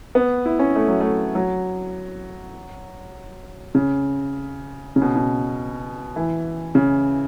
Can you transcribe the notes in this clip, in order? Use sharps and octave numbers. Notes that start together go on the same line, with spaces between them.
B3
E4
C#4
A3
F#3
A3
F#3
C#3
C#3
B2
B2
E3
C#3